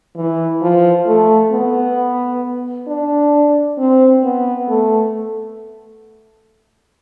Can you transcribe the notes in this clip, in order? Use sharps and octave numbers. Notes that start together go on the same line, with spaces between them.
E3
F3
A3
B3
D4
C4
B3
A3